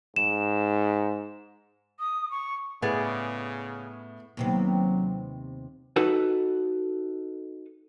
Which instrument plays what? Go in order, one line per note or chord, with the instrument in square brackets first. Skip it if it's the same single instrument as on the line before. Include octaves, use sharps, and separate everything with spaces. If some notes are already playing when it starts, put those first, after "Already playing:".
[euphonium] G#2 [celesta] E7
[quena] D#6
C#6
[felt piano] A2 [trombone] C#3 [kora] B3 G#4 D5
[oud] D#2 C3 B3 [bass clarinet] F#3
[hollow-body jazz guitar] D#4 F#4 A4 B4